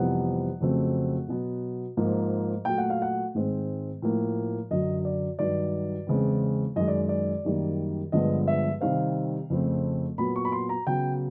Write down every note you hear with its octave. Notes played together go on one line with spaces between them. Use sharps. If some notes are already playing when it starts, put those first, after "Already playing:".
Already playing: F2 C3 E3 G3 B3 F#5
F2 C#3 F#3 A3 C4
B2 F#3 B3
G#2 F3 A#3
A#2 F#3 A3 G5
F#5
F5
F#5
G#2 D#3 G#3 C4
A2 F3 A#3
F#2 D3 F#3 D#5
D5
G2 D#3 F#3 D5
E2 C#3 E3 G#3 C4
F#2 D#3 G#3 D#5
D5
D5
F#2 D#3 G3 A#3
G2 D3 F3 G#3 B3 D#5
E5
C3 D#3 G3 C4 F5
F2 C#3 F3 A3 C4
A#2 F#3 B3 B5
C#6
B5
C6
A#5
C#3 F#3 B3 G5